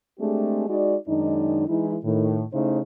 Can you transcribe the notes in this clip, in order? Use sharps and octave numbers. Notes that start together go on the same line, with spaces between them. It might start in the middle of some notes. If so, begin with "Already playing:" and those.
G#3 A3 C4 D4 G4 G#4
G#3 D#4 F#4 D5
F#2 D#3 G#3 D4 D#4
E3 G#3 D#4 E4
A2 D#3
C#3 A3 D#4 E4 C5 C#5